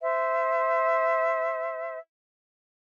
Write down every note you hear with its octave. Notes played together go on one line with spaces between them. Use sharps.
C5 E5